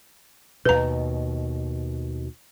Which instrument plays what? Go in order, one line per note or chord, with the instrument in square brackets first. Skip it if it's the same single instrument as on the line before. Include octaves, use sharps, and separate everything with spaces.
[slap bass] D#2 B2 [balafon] B4 A#5